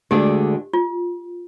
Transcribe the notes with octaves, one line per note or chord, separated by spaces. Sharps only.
D2 D3 G#3 D4 G4 G#4
F4